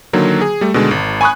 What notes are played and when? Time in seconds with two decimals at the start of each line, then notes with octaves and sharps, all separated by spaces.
0.13 D3 D#3 F#3 A#3
0.41 G#4
0.61 G3 A3
0.74 B2 D3 D#3 G#3
0.91 G#1
1.21 G#5 B5 C#6 D#6 F#6